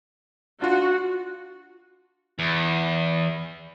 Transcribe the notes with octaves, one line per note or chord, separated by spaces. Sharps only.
D4 F4 F#4
E2